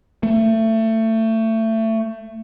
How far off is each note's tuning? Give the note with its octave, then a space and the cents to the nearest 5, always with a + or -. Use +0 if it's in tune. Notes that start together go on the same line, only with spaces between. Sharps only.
A3 +25